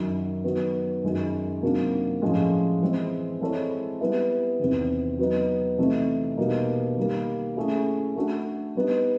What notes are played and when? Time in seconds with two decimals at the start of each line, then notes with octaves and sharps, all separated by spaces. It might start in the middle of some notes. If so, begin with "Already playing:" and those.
Already playing: F#2 D#3 F#3
0.44 D#3 F#3 B3
1.03 F#2 D#3 G#3 C#4
1.62 C3 D#3 F#3 A#3 D4
2.21 A2 F3 G#3 C#4
2.82 E3 G#3 C4
3.41 G#3 C4 E4 A4 C#5
4.01 G3 B3 E4
4.59 E2 C3 D#3
5.18 F#3 B3 D#4
5.78 C3 E3 A3 C4 D#4
6.37 B2 G3 A#3 D#4
6.97 D#3 G3 A#3
7.57 A3 C#4 E4 G#4
8.16 A3 D4 F#4 A4
8.75 G3 B3 D#4